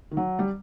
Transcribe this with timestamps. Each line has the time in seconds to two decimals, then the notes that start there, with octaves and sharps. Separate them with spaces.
0.11 D#3
0.17 F#3
0.39 G3